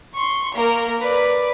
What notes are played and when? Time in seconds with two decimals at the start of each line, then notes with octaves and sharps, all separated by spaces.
0.14 C6 C#6
0.54 A#3 A#4
1.01 B4 D5